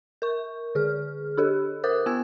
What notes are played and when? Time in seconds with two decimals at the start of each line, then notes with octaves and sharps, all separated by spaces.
0.22 A#4 C#6
0.75 D3 G#4 F6
1.37 D4 G4 A4
1.84 A#4 C5 D6 D#6 F#6
2.06 B3 G5 E6 G#6